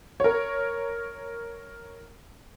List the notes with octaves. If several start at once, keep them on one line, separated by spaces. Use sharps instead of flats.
A#4 C#5